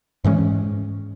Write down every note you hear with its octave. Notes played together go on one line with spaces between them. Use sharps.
G#2 E3 G#3 C#4